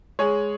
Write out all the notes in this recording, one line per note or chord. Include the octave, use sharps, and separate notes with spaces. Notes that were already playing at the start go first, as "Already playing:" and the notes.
G#3 G#4 C#5